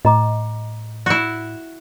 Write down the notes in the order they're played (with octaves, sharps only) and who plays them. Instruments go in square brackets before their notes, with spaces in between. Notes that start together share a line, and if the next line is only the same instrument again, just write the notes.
[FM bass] A2 [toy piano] D#5 A#5 D6
[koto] E4 F#4